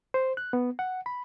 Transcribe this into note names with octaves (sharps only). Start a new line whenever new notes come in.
C5
F#6
B3
F#5
B5